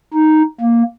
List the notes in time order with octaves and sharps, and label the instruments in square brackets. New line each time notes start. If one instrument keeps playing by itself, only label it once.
[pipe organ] D#4
A#3